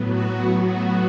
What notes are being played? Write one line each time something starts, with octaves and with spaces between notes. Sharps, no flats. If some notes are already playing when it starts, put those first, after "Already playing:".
Already playing: A2 F#3 B3
F#4
F#4